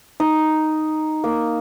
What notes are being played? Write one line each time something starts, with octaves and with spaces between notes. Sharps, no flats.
D#4
A#3